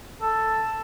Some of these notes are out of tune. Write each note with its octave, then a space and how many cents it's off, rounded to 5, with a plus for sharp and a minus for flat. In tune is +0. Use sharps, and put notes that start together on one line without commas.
A4 +5